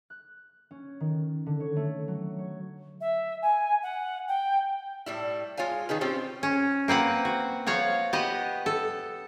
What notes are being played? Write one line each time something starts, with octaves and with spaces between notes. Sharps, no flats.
F#6
C#4
D#3
D3
C#5
A3
F#3
C#5
E5
G#5
F#5
G5
A2 G3 E4
G#3 F4 C#5 F5 G#5
D#3 D#4 G#4 B4
C4 C#4 F4 G4 C5
C#4
A#3 C4 B4 F#5
F#4
F3 F#4 C#5 F5
B3 G4 D#5 F#5
A4